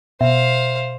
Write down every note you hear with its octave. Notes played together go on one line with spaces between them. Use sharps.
B2 C5 E5 F5